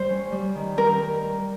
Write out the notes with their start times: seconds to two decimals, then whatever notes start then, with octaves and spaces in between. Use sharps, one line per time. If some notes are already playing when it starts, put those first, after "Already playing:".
Already playing: G3 C5
0.09 C#4
0.32 G3
0.55 D#3
0.77 G3 A#4